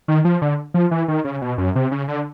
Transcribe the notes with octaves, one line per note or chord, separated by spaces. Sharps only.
D#3
F3
D3
F3
E3
D#3
C#3
B2
F#2
C3
C#3
D3